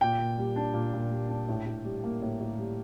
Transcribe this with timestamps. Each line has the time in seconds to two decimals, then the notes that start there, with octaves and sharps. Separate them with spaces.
0.01 A#2 G5
0.19 A#2
0.38 G3
0.56 D4
0.74 A#2
0.93 A#2
1.11 G3
1.29 D4
1.48 A2
1.66 A2
1.84 G3
2.04 A#3
2.22 A2
2.40 A2
2.58 G3